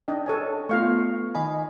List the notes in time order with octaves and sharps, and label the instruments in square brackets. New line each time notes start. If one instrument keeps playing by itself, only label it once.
[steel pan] D4 D#5 G5
A4 C#5 G#5
[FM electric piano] A3 B3 [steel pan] F4 F5 C#6
[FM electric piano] D#3 D#5 G#5 [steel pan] B5